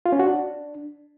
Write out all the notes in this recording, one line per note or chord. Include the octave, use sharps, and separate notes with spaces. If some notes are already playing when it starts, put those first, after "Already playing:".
F4
C#4
F#4
D4